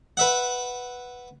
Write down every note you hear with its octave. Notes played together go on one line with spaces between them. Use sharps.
B4 E5 F#5